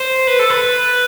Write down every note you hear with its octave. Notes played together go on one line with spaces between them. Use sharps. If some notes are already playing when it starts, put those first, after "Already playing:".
Already playing: C5
B4
A4
B4